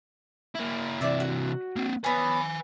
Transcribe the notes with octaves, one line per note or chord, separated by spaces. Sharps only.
A#3 E4
C3 E3 D5 E5
F#4
A#3 C4
B3 C#4 B4 G#5